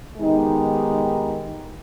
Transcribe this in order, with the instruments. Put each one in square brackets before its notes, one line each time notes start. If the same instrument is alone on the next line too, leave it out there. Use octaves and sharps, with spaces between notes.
[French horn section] D#3 G#3 B3 D#4 G4